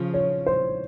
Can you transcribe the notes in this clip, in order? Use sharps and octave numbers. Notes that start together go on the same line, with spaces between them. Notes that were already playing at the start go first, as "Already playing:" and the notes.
Already playing: C#3 F3
C#5
C5